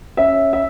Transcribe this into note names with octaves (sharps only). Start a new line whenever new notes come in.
C#4 E5
E5